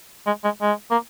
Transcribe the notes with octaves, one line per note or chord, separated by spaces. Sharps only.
G#3
G#3
G#3
A#3